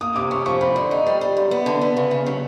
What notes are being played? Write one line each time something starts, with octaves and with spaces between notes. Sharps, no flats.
A#3 D#6
C3 D6
C#4 C#6
F3 C#6
C4 B5
D3
D#4
G3
G3
F#2
B3
D3
B3
C#3
C#3
F#3